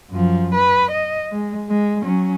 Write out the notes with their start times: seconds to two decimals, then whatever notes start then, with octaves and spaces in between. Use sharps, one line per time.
0.11 F#2 F3
0.54 B4
0.91 D#5
1.32 G#3
1.69 G#3
2.04 F#3 C#4